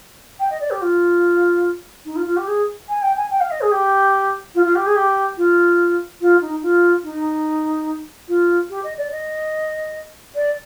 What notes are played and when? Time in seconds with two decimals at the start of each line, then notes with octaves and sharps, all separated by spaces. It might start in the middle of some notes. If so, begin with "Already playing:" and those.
0.39 G5
0.50 D#5
0.60 D5
0.70 G4
0.81 F4
2.05 D#4
2.15 F4
2.25 F4
2.36 G4
2.47 G#4
2.88 G#5
3.02 G5
3.16 G#5
3.30 G5
3.40 F5
3.50 D#5
3.61 G#4
3.71 G4
4.54 F4
4.64 F4
4.75 G4
4.86 G#4
4.95 G4
5.37 F4
6.20 F4
6.41 D#4
6.62 F4
7.03 D#4
8.28 F4
8.69 G4
8.83 D#5
8.97 D5
9.11 D#5
10.35 D5